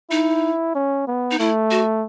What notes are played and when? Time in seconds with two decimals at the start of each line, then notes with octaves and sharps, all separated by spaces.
0.10 D#4 E4
0.75 C#4
1.08 B3
1.31 D#4
1.39 A3 E4
1.71 F#4